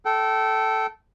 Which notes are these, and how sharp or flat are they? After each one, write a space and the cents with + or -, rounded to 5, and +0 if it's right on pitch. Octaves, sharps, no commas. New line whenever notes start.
A4 -5 G5 -30